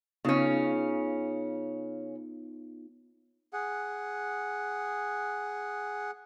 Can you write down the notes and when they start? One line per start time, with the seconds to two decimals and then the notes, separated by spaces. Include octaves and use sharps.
0.25 C#3 B3 C#4 D#4 F4
3.53 G#4 F#5